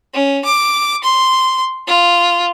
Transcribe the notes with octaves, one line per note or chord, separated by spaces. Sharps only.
C#4
D6
C6
F4